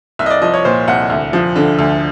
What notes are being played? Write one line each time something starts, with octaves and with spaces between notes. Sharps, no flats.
C2 E5
D#5
D5
F3 D#5
C#5
A#2 C5
C2 F#5
D2
F3
D3
D2